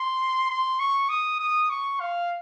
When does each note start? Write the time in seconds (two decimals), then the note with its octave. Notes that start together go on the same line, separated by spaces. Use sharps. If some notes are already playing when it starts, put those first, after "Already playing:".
Already playing: C6
0.50 C6
0.80 C#6
1.09 D#6
1.40 D#6
1.70 C#6
2.00 F5